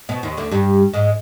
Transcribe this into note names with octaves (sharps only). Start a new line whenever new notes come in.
B2 B3
D#2 D#3
D2 D3
G2 G3
G#2 G#3